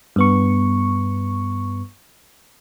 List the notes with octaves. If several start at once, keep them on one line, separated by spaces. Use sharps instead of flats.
G2 B3 C#6